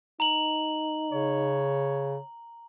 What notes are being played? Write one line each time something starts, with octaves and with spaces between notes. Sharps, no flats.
D#4 A#5 F#7
C#3 C#5